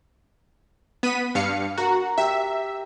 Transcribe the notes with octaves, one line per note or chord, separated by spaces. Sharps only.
B3 B6 D#7
G2 F5 C#7
F#4 A#4
G4 E5